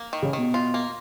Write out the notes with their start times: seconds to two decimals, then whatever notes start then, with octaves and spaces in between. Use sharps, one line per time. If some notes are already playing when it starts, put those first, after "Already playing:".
Already playing: A#3
0.13 D#3
0.22 C#3
0.33 B2 D#3
0.54 F4
0.74 A#3